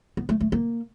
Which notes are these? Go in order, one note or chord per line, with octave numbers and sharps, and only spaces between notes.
B3
A3
A3
A#3